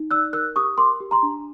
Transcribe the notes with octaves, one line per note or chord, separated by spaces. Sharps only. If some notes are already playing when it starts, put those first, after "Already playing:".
Already playing: D#4
D5 E6 F#6
A#4 E6 F#6
G4 C#6 D#6
A#4 C6 D6
G4
A#5 C6
D4